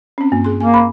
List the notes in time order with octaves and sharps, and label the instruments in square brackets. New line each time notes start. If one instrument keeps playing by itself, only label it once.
[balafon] C4 C#4
[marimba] G2 [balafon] A#3
[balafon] G#4 C6
[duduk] A#3 [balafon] G#5
[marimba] B5